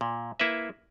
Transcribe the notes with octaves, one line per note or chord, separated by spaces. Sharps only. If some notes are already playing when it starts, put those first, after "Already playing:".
A#2
A#3 E4 B4 E5